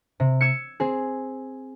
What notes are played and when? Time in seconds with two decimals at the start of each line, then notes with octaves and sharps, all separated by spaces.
0.20 C3
0.41 E6 G#6 C#7
0.80 C4 G#4